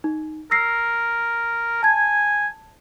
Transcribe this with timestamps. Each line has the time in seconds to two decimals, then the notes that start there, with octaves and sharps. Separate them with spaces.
0.04 D#4
0.51 A#4 E6 A#6 C7
1.83 G#5 A5 G#6